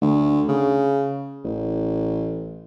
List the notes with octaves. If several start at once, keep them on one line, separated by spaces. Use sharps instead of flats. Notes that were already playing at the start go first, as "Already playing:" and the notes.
D2
C#3
A1